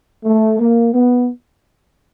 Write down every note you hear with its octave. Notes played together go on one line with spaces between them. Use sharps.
A3
A#3
B3